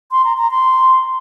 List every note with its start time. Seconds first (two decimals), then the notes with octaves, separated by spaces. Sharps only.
0.11 C6
0.25 A#5
0.37 A#5
0.51 C6